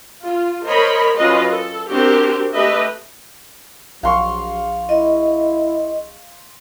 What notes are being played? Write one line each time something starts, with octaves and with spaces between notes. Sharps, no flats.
F4
A#4 C5 C#5 D#5 B5
F#3 C#4 F4 A4 B4 D#5
A4
C4 D4 F#4 G4 A#4 C5
A3 G4 B4 D#5 E5
A#1 F#3 F5 C6 C#6
E4 D#5